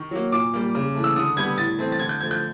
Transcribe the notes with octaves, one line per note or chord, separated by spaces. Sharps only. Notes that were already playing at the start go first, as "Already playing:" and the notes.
Already playing: D#3 C#6
F#3 A#3
A#2 D6
G3 A#3
C#3
E3 A3
E6
D3 D#6
G3 B3 G#6
A2 A6
E3 A3 C4
A6
D3 G#6
G6
F3 A3 G#6
G6